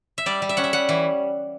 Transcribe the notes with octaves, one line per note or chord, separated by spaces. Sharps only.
E5
G3 D5
G3
E5
C#4 F#5
E5
G3 F#5
E3